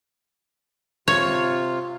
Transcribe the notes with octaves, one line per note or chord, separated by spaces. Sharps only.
C3 F4 C#5